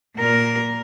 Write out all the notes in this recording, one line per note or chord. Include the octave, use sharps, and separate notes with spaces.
A#2 A#4